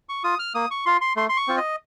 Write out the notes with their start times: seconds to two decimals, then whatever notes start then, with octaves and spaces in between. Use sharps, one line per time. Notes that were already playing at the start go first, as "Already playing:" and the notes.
0.09 C#6
0.24 F4 D#6
0.39 F6
0.55 A#3 D#6
0.71 C#6
0.86 F4 C6
1.01 C6
1.16 A3 C6
1.29 C6
1.37 C#6
1.48 C4 F4
1.57 D#5